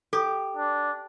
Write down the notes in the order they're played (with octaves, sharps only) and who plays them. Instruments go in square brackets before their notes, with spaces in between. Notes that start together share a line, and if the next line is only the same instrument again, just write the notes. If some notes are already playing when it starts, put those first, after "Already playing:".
[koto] G4 [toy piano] A4
[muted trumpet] D4